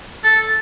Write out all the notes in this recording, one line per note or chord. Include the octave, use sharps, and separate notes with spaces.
A4